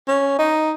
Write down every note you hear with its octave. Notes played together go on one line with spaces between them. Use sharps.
C#4
D#4